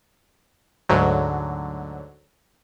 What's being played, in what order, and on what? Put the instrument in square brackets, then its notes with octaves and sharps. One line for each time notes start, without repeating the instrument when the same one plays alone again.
[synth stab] D2 G#2 D3 F#3